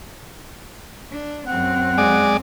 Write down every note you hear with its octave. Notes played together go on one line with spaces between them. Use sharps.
D4
F#2 C4 F#5
G#3 D5